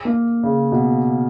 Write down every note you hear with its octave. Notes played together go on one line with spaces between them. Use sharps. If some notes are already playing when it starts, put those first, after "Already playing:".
A#3
C#3
B2